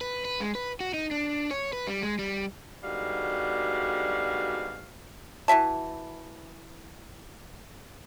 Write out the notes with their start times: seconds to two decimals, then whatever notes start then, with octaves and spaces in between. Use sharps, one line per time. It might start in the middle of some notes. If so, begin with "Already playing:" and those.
0.01 B4
0.25 B4
0.40 G#3
0.55 B4
0.80 F#4
0.94 D#4
1.11 D4
1.51 C#5
1.73 B4
1.87 G3
2.03 G#3
2.19 G3
2.84 G#2 B2 D3 G3 F#4 F5
5.48 E3 F#4 E5 A5